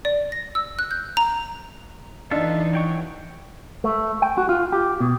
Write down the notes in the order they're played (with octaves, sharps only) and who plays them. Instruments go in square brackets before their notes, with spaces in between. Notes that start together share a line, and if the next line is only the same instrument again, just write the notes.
[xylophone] D5
A#6
E6
F#6
G6
A#5
[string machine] E3 [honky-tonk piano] D4 [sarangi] D#4 [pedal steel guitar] F4 A4 E5
[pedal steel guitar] F#3 G5 C#6
[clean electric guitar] A3
G5
F#4
F4
G4
B2